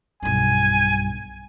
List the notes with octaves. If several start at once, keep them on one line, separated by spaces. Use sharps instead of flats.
B1 G2 G#5